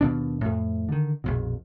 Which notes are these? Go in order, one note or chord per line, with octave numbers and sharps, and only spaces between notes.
D#2 B2 D4
F2 A2
D3 D#3
A#1 F2 B2